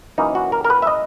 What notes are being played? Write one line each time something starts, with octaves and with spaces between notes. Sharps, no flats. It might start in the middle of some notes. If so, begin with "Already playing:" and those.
F#2 E3 A#3 C#4 D#4
F#4
A#4
A#4
B4
E5
D#5